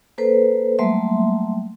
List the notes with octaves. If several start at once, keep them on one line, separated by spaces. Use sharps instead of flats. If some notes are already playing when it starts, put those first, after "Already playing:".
A#3 A4 B4 C5
F#3 G3 A3 A#3 E5 C6